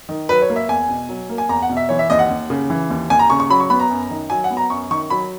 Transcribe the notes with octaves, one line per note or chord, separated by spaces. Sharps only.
D#3
F#3 B4
C#5
A#3
E5
E2 G#5
B2
F#3
A#3
G#5
E2 A#5
F#5
B2
E5
E3 C#5
E5
D#2 D#5
F#5
D#2
C#3
E3
D#2
D#2 G#5
A#5
C#3 C#6
C#6
F#3 B5
C#6
B3 B5
A#5
F#2
D#3
F#3 G#5
F#5
B3
A#5
F#2 C#6
D#3 C#6
F#3 B5